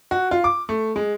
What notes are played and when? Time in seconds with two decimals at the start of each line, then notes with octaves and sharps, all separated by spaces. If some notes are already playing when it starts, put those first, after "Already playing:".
0.11 F#4
0.31 F4
0.44 D6
0.69 A3
0.96 G#3